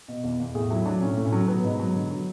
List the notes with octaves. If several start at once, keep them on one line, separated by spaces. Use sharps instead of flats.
B2
E2
E2
A2 G#4
F#3 E4
F#3 D4
A2 C#4
A2
C#4
F#3
F#3 B3
G#2
F#3
D3
F#3